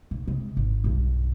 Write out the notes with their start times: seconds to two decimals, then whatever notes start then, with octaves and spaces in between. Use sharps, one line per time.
0.11 B1
0.27 C3 G#3
0.57 G#1
0.84 B1 G2